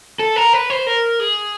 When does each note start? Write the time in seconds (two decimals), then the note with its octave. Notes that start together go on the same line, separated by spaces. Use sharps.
0.19 A4
0.36 A#4
0.53 B4
0.70 C5
0.87 A#4
1.20 G#4